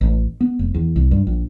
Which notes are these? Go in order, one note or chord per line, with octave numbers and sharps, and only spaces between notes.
A1
B3
F1
E2
C2
G2
A#1